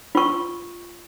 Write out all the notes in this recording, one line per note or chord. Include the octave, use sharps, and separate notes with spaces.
F4 C#6